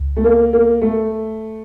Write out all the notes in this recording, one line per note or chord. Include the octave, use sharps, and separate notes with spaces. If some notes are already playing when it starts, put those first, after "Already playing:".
Already playing: C#2
A3
A#3
A#3
A3